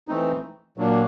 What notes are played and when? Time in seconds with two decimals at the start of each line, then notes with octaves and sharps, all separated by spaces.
0.08 E3 A3 C4 D#4
0.77 A#2 F#3 A#3 D4